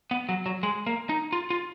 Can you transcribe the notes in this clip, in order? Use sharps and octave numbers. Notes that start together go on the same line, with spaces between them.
B3
F#3
F#3
G#3
A#3
D#4
F4
F4